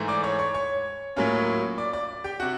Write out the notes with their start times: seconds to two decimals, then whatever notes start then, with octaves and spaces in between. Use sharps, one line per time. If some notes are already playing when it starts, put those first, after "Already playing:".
Already playing: G#2 E3 A3
0.08 D5 D6
0.24 C#5 C#6
0.39 C#5 C#6
0.54 C#5 C#6
1.16 A2 F#3 A#3 C#4 F4
1.78 D5 D6
1.93 D5 D6
2.24 G4 G5
2.40 C3 F#4 F#5